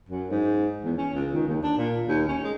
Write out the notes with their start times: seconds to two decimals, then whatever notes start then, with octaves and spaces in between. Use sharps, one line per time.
0.09 F#2
0.30 G#2
0.85 E2
0.97 C#4
1.14 C#2
1.33 D#3
1.48 D#2
1.62 D4
1.77 A#2
2.08 D#2
2.28 C#4
2.44 G#3